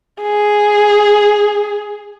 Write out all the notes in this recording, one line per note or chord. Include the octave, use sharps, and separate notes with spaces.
G#4